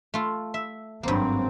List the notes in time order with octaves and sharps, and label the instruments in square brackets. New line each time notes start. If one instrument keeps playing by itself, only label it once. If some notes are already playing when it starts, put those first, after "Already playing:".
[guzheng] A3 F4
E5
[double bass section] G#1 F#3 C4 [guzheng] G2 A#3